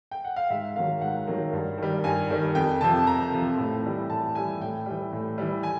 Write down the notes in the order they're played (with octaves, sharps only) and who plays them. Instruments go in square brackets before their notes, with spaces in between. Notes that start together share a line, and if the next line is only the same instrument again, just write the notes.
[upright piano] G5
F#5
F5
G#2 E5
D#3 F#3 F5
G#2 F#5
D#3 F#3
G2
D#3 G3
G2 G#5
D#3 G3
F2 G5
C3 F3 A5
F2 A#5
C3 F3
A2
E3 G3
A2 A5
E3 G3 G#5
A2 G5
E3 G3
A2
E3 G3
G#5